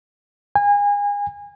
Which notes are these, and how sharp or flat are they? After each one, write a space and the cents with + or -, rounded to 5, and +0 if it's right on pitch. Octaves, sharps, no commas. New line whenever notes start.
G#5 -30